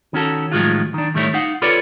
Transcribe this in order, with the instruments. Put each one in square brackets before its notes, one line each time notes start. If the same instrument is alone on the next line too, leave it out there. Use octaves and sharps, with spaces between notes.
[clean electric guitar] D#3 C#4 F#4 A4
A2 D#3 F3 F#3 G#3 F4
D#3 D4
A2 D#3 G3 A3 E4 C#5
D#4 F5 F#5
F4 A4 B4 C#5 D5